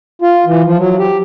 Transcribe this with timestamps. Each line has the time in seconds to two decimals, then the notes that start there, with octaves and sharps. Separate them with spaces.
0.22 F4
0.46 E3
0.67 F3
0.79 F#3
0.99 G4